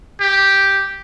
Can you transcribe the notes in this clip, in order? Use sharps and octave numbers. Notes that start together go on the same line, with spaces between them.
G4